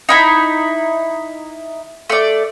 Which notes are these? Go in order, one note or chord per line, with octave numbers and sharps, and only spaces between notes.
D#4 E4 B5
A3 D5